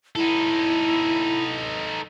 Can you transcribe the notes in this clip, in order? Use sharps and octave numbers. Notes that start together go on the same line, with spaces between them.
D#4 E4 A4